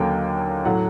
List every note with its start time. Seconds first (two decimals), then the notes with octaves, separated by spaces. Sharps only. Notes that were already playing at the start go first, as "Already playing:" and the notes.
Already playing: D#2 D3 F#3 A#3 C#4 G5
0.65 A2 F#3 A3 F#5